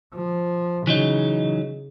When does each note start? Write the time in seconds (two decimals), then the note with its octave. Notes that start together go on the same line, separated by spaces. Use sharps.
0.15 F3
0.87 C#3 E3 F#3 D#4